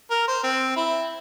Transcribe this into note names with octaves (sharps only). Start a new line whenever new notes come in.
A#4
C5
C4
E4